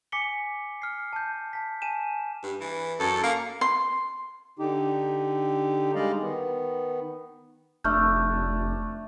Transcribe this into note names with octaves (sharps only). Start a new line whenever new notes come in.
G#5 D6 B6 C#7 G7
F6 C7
A5 G6
A5 B6
G#5 A5 D#7 E7
G2
E3
F#2 A4
A#3 F5
C6
D3 D#4 G4
G3 G#3 D#4 D5 D#5 F5
D#3 B3
F1 A3 D4 C#6 F6 G6